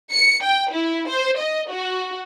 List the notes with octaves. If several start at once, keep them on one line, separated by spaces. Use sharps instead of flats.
C#7
G5
E4
C5
D#5
F#4